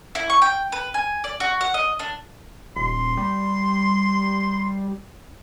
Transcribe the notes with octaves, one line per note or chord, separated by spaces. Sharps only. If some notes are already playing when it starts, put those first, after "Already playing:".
E4
C#6
G5
B4
G#5
D5
F#4
F#5
D#5
D4
D#1 C6
G3